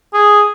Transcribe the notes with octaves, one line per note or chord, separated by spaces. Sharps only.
G#4